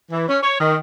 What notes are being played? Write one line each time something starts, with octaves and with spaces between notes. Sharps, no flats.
E3
C#4
C#5
D#3